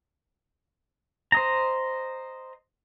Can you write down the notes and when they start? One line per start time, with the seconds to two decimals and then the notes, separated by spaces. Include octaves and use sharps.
1.32 C5 D#5 A#5